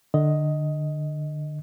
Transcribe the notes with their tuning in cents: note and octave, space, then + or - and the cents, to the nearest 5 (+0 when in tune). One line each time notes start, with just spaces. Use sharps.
D3 +25 D#5 +10